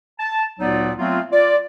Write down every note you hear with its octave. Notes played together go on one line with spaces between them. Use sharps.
A5
D2 A#2 F#3 B3 D#4 D5
F#3 A3 B3 C4 F4
F4 D5